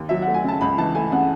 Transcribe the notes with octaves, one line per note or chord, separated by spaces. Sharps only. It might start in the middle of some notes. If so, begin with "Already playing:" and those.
Already playing: D#2
F#3 E5
F#5
A3
G#5
C#3 A5
C#2 B5
E3 A5
A3 G#5
C#3 F#5